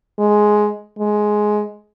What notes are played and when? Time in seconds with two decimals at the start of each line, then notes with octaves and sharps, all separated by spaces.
0.18 G#3
0.99 G#3